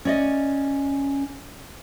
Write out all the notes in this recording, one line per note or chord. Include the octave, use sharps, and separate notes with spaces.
C#4 D5 D#5